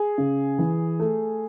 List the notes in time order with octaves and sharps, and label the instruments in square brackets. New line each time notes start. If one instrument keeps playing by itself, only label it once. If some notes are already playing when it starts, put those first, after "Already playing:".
Already playing: [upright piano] G#4
C#3
E3
A3